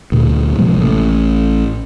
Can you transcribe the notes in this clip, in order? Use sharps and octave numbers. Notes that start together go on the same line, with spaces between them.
D2 A#2
C3 F3 G#3 A#3
A1